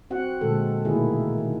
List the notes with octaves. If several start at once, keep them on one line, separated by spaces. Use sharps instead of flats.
C4 F#4 F#5
A#2 D3 G#3 A4
B2 D#3 A3 A#3 E4 G#4
D#3